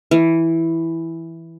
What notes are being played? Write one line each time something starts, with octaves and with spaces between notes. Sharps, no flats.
E3